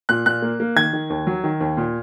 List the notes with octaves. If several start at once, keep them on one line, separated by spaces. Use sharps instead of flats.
A#2 F#6
A#2 F#6
A#3
A#3
D#3 G#6
D#3
D#2
F#3
D#3
D#2
A#2